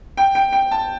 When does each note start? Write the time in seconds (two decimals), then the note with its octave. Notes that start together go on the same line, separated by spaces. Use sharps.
0.17 G5
0.35 G5
0.52 G5
0.71 A5